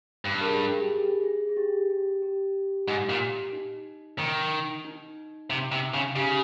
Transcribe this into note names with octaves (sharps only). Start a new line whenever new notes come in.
G2
A#4
G#4
G#4
G4
G#4
G#4
G#4
G4
G4
G4
G#2
A#2
D#4
D#3
D#4
C3
C3
C#3
C#3 G4